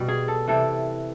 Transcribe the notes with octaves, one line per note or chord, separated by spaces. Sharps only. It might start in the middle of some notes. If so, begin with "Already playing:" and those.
Already playing: B2 G3
G#4
A4
C3 E3 G3 A4